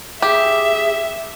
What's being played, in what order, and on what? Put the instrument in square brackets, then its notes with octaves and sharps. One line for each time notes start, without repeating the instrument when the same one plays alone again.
[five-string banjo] G4 [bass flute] G#4 [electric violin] E5